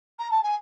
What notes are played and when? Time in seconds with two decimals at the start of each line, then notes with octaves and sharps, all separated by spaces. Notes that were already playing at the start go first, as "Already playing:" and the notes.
0.18 A#5
0.30 A5
0.42 G#5